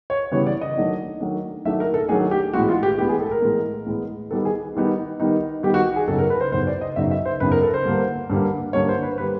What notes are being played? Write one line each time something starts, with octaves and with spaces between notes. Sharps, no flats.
C#5
C#3 E3 G3 B3 C#5
D5
D#5
D#3 F#3 A3 D4
D#3 F#3 A3 D4
D#3 F#3 A3 D4 E5
A#4
A4
D#3 F#3 A3 D4 G#4
G4
A2 E3 G#3 B3 F#4
F4
G4
A2 E3 G#3 B3 G4
G#4
A4
A#4
A2 E3 G#3 B3
A2 E3 G#3 B3
D#3 G3 B3 D#4 A4
G#4
D#3 G3 B3 D#4
D#3 G3 B3 D#4
D#3 G3 B3 D#4 G4
F#4
G#4
F#2 C#3 F#3 B3 D#4 A4
A#4
B4
C5
F#2 C#3 F#3 B3 D#4 C5
D5
D#5
F#2 C#3 F#3 B3 D#4 E5
E5
C5
F#2 C#3 F#3 B3 D#4 B4
A#4
A4
C5
G2 D3 G3 A#3
G2 D3 G3 A#3
G2 D3 G3 A#3 C#5
C5
B4
D3 G3 A#3 B4